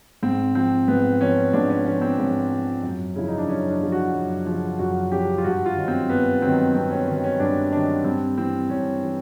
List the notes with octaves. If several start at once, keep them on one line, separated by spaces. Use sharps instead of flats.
G#2 C4
F3 C4
G#2 B3
F3 C#4
G#2 D4
C#4
F3 C#4
C4
G#2 C#4
F3
F#2
C#3 F3 E4
D#4
D4
F#2 C#4
D4
C#3 F3
F#4
F#2
C#3 F3
F#2 F#4
C#3 F3 G4
F4
G2 F#4
F4
D#3 F#3
C4
G2 B3
D#3 F#3 C4
G2 C4
C#4
D#3 F#3 C#4
C#4
G2 D4
D#3 F#3 D4
G2 C4
E3 C4
G2 C#4
E3